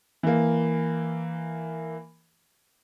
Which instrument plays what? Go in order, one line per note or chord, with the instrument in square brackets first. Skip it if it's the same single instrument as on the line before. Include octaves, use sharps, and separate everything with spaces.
[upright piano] E3 A#3